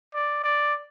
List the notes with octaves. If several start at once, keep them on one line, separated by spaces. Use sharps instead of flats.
D5
D5